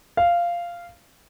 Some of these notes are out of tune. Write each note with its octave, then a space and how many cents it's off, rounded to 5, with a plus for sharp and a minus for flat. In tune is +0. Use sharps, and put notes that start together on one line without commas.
F5 -10